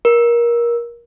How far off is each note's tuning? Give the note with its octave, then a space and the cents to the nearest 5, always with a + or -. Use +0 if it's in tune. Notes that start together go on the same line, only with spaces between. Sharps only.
A#4 +20